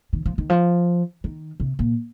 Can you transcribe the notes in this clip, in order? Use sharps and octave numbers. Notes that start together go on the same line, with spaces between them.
D#3
F3
D#3
F3
D#3
C3
A#2